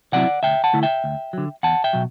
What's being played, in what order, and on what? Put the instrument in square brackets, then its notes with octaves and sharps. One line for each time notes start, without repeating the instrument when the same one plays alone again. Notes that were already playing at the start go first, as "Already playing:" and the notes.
[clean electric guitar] C3 F#3 C4 E4 D5 F#5
D2 E5 G5
F#5 A5
D3 A3 E4
E5 G5
D2
D3 F#3
E2 F#5 A5
E5 G5
B2 F#3